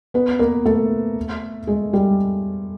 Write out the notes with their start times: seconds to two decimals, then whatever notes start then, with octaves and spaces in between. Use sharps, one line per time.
0.14 B3 B4
0.39 A#3 A#4
0.65 A3 A4
1.67 G#3 G#4
1.93 G3 G4